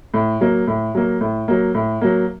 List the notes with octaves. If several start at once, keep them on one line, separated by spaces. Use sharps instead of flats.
A2
F#3 A#3
A2
F#3 A#3
A2
F#3 A#3
A2
F#3 A#3